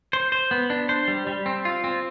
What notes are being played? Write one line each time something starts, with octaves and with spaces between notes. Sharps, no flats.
C5
C5
B3
D4
C5
G3
G3
C4
F4
C4